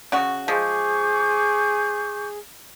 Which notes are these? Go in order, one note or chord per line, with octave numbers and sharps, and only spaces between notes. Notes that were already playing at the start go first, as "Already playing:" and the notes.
C#3 F#4
F3 G#3 G#4 C#6 D6 G6